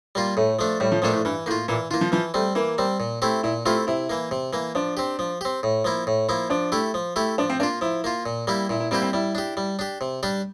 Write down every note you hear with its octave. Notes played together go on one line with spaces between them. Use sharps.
G3 A#3 F4
A2 A3
F3 A3 D4
A2 G3
F3
A#2 F3 A3 D4
A2
G2 E3
A2 A#3 F4
A#2 E3
E3 A#3 F4
F3
E3 F3
G3 A3 C4
E3 A#3
G3 C4
A#2
A3 C4 E4 G4
A#2 E4
A3 C4 E4 F4 G4
C3 E4
E3 A#3
C3
E3 A#3
F3 D4
C4 G4
F3
C4 G4
A2
F3 A#3 E4
A2
F3 A#3 E4
F3 D4
A3 E4 G4
F3
A3 E4 G4
F3 D4
C4
A#3 D4 F4
F3 E4
A#3 F4
A#2
G3 A#3 E4 G4
A#2 E4
E4
G3 A#3 C4 E4 G4
C4
G3 E4
D4 G4
G3
D4 G4
C3
G3 D4 G4